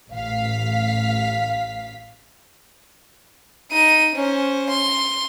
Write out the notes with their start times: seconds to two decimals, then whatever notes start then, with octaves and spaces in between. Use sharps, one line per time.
0.11 A1 F5 B6
3.72 D#4 D#7
4.15 C#4 C5
4.69 C6